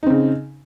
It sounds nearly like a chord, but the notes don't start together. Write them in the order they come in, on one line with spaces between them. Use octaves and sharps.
D#4 C4 C#3